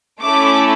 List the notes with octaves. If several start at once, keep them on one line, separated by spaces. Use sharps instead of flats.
A3 C#4 E4 A4 D6